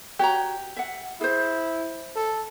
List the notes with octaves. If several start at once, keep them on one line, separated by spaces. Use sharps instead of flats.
F#4 G4 C#5 A#5
E5 F#5
E4 G#4 C5
A4